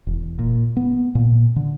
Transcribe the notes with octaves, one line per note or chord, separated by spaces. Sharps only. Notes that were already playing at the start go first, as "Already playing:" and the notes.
E1
A#2
B3
A#2
D3